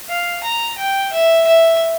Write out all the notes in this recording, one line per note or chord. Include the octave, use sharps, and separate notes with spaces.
F5
A#5
G5
E5
E5